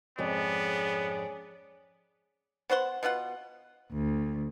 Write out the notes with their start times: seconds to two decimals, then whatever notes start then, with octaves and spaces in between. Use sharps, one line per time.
0.18 F2 G#2 B3 C#4 G#4 D5
2.70 B3 C5 F#5 C6
3.03 B2 B3 F4 F#5
3.93 D2